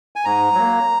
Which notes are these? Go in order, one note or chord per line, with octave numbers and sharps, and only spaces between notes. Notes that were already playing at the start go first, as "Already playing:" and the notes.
G#5
G#2 A#5
F#3 A#3